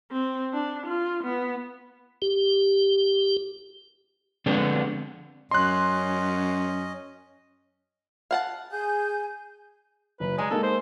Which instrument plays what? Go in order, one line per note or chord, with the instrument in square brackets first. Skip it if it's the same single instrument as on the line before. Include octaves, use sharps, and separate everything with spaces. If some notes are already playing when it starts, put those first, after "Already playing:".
[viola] C4
D4
F4
B3
[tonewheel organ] G4
[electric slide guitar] D3 F3 G#3 B3 C4 D4
[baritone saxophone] F#2 [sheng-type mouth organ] C#4 D#5 [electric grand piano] C6 F#6
[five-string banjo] F5 F#5 A5
[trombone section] G#4 [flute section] G#5 G6
[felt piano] F#1 [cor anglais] B4
[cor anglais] G#3 [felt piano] D5 G#5 A#5
[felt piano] G#3 A#3 D#4 [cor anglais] A4
[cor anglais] C5